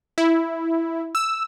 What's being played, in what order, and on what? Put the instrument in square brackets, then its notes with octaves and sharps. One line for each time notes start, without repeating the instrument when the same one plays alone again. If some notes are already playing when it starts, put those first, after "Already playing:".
[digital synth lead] E4
E6